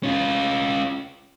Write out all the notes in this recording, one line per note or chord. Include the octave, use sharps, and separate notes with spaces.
C#4 F4